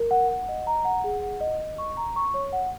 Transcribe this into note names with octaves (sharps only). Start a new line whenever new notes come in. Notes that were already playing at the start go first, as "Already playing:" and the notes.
Already playing: A#4
F#5
F#5
D#5
A#5
F#5
G#4
F#5
D#5
D#5
C#6
A#5
C#6
C#5
F#5